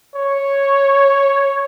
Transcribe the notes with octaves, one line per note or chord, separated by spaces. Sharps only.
C#5